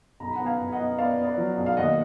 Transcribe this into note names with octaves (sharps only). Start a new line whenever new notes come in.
B1 A#5
B5
F#5 A#5
B3
F5 G#5
B1
D#5 F#5
B3
B3 D5 F5
B3
D5
F#3
B1
F5
D#2 D#5 F#5